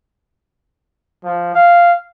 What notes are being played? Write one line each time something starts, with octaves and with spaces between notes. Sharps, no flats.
F3
F5